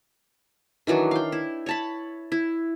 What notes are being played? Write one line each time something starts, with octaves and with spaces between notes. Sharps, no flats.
D#3 E3 F#3 D4
F5 G5
E4
C#5 A5 B5
E4